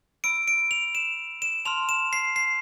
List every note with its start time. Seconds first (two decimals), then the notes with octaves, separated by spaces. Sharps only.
0.24 B5 E6 D7
0.48 D7
0.71 F7
0.95 E7
1.42 E7
1.65 A5 C6 F6 F7
1.89 E7
2.13 C7
2.36 C7